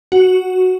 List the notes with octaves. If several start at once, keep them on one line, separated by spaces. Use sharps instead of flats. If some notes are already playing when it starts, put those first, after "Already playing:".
F#4